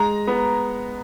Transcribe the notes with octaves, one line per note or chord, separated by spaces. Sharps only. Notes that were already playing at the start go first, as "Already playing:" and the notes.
Already playing: G#3 A#5
B3